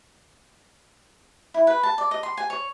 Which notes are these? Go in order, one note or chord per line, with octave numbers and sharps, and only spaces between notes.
E4
B4
A5
D5
D#5
C6
G#5
C#5